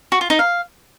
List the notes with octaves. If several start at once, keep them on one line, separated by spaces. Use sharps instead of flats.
F#4
F4
D#4
F5